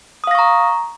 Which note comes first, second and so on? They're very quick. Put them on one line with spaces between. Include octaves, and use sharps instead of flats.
D#6 F5 A#6 C#6 A#5